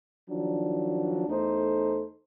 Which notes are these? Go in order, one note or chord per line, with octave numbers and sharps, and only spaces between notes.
D#3 F3 F#3 D4
E2 A3 D#4 A4 C5